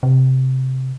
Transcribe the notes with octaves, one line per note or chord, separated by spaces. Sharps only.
C3